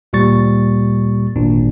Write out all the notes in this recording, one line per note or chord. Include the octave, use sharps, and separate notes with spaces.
D2 A#2 G3 C#6 A6
G#1 D2 A#2 D4